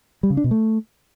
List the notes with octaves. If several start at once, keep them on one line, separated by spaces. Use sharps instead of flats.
G3
C#3
D4
B2
A3